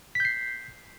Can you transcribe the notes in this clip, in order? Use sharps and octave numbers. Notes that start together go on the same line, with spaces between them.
G6 B6 C7